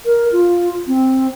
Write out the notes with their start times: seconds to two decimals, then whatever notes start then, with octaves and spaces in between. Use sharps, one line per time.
0.05 A#4
0.32 F4
0.87 C4